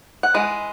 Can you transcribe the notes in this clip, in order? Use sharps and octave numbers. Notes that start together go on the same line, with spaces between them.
F#5
E3 G#3